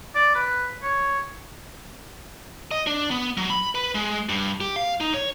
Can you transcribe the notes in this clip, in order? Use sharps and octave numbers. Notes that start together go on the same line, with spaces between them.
D5
B4
C#5
D#5
D4
B3
F#3
B5
B4
G#3
G2
G4
F5
D#4
C#5